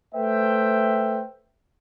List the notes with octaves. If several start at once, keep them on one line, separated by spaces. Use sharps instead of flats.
A3 B4 C5 E5 G5